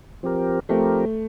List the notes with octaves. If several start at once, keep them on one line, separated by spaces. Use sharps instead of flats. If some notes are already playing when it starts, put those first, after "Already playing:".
F3 C4 G4 A#4
F3 A3 C4 G4 A#4